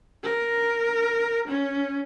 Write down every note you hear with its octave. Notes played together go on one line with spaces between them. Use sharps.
A#4
C#4